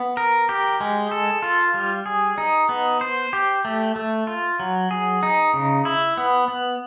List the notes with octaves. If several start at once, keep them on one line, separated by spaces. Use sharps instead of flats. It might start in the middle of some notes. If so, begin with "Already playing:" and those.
Already playing: B3
A#4
G4
G#3
A4
F4
G3
G#4
D#4
B3
C5
G4
A3
A3
F4
F#3
G#4
D#4
C#3
E4
B3
B3